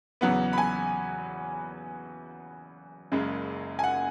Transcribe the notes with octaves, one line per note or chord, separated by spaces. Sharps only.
E2 C#3 F#3 B3 F#5
B5
G#5
F#1 F#2 C#3 G#3
G#5
F#5